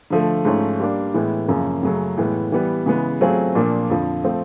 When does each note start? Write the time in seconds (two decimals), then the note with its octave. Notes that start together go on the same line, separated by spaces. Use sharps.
0.10 D3 F3 A3
0.45 G#2 F3 A3 C#4
0.80 G3 A#3 D4
1.14 A2 E3 G#3 B3
1.48 F#2 C#3 F3 A#3
1.83 F#2 C#3 F#3 A3
2.17 A2 E3 G#3 B3
2.52 E3 G3 B3
2.86 C#3 E3 G#3 B3
3.21 F#3 A3 C4 F4 G#4
3.55 A#2 F3 A#3 D4
3.90 F2 D3 F3
4.24 F3 A3 C4